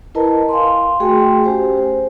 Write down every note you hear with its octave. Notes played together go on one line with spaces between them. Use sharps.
E4 A#4 B4 D#5 A5 A#5
F5 G#5 C6
A3 F#4 G#4 G5 G#5 C6
C#4 G4 C5 G#5
C5